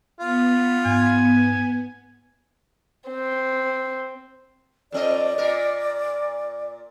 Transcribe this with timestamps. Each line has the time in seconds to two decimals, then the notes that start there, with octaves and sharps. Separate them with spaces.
0.20 B3 F4
0.85 G#2 G#5
3.10 C4
4.92 F2 C4 D5 D#5
5.38 A#2 A#4